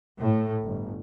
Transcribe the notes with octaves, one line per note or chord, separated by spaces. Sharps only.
A2
G1